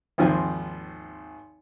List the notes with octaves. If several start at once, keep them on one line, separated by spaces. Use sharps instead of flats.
G#1 D#2 F3 C4 G#5